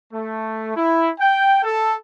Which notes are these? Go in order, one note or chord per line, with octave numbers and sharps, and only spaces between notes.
A3
E4
G5
A4